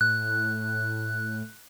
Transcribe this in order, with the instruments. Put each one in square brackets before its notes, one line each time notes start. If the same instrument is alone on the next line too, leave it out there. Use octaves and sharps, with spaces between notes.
[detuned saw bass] A2 [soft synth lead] F#6